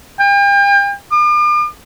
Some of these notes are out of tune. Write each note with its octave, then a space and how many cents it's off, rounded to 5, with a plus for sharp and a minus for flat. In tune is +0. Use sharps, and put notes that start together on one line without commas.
G5 +40
D6 +45